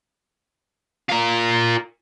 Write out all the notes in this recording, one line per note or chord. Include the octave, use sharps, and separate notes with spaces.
F4 A#4